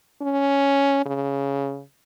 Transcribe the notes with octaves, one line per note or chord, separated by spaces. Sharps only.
C#4
C#3